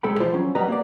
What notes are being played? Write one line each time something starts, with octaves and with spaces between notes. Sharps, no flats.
B1 G#3 A4 G5 B5
E3 F3 F4 C5
F#3 C#4
F#3 G3 B3 B4 D#5 A#5
A#3 D5